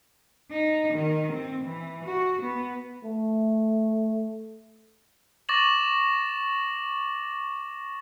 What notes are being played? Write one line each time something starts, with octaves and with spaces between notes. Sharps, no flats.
D#4
D#3
C4
E3
F#4
B3
A3
C#6 D6 A6 A#6 E7 F#7